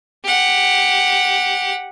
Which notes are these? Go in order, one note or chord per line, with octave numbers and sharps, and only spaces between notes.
G4 F#5